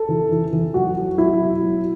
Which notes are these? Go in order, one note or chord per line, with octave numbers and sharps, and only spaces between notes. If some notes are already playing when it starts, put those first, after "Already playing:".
Already playing: A4
E3
E3
E3
F#3 F#4
F#3
F#3 E4
B2
F#3